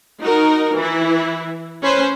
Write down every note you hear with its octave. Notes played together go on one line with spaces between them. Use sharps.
D#4 F#4 A#4
E3 E4
C#4 B4 C5